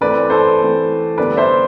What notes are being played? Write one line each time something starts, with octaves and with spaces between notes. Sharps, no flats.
E3 A3 C4 B4 D5
A4 C5
E3 A3 C4
D3 G3 B3 B4 D5
C5 E5